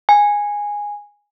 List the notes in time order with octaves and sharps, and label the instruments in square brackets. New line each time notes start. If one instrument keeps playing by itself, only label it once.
[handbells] G#5